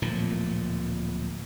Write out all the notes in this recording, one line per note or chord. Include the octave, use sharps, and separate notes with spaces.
D1 A#2 F3